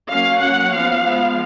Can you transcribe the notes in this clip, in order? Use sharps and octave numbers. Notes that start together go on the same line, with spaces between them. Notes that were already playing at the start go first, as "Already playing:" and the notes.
F#3 A#3 C#4 F5
F#3 C#4 F#5
F3 B3 F5
F3 G#3 B3